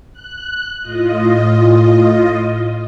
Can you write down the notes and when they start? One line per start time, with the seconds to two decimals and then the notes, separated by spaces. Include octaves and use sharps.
0.13 F#6
0.82 A2 F4 D#5